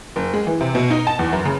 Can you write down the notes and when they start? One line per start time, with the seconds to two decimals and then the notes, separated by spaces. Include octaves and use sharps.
0.16 F#1
0.34 G#3
0.47 E3
0.61 C3
0.75 B2
0.91 D#4
1.07 A5
1.19 E2
1.32 F#2
1.45 C#3